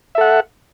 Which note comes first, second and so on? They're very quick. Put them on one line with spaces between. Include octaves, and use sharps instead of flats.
E5 A4 F#5